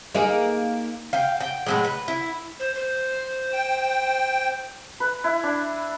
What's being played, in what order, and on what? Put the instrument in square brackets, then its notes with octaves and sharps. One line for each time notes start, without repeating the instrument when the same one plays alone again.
[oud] A#3 D#4 G#4
[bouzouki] F5 G5
G5
A2 F#3 G#3
B4
E4
[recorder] C5
C5
[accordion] G5
[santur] B4
E4
D4